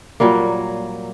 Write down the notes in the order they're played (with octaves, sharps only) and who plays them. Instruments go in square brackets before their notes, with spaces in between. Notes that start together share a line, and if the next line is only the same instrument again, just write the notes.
[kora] A#2 F#3 G3 A#3